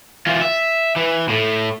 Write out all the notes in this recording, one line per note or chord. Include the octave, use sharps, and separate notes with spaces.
E3 F4
E5
E3
A2